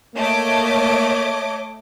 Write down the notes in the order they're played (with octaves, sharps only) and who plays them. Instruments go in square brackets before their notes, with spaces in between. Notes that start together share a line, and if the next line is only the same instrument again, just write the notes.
[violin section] A3 D#5 D6 [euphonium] A#3 [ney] C#5